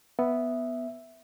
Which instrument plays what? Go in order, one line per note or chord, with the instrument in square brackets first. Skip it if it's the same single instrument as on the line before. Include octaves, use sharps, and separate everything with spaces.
[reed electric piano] B3 [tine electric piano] E5